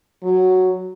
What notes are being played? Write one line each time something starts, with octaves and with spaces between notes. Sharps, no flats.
F#3